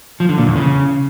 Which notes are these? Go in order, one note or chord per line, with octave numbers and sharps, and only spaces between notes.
F3
D3
A#2
E2
C#3